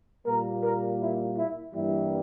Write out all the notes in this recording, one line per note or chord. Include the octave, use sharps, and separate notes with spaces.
A#2 G3 A#3 A#4
A#4
E4
E4
G2 E3 G3 A#3 E4